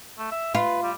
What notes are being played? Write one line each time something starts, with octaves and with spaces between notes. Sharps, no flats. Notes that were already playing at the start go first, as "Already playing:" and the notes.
A3
E5
F4 B4
G3